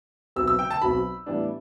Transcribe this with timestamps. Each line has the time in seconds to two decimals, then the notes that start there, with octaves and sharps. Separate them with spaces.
0.36 B1 B2 F#3 C4 E6
0.48 E6
0.59 G5
0.71 A5
0.81 B1 B2 F#3 C4 B5
1.26 A2 E3 G3 B3 D4